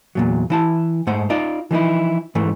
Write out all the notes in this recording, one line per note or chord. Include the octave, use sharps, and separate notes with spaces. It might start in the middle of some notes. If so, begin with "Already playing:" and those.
E2 A#2 F#3
E3 E4 A5
G#2 A3 C5 F#5
D#4 F4 D5
E3 F3 D#4 E4
G#2 E3 A3